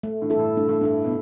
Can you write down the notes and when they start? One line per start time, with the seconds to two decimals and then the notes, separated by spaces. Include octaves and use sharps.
0.03 A3
0.22 A2 D3
0.30 G2 E4 A4
0.39 A2
0.57 G2 A3
0.69 A2
0.81 G2 E4 A4
1.04 B2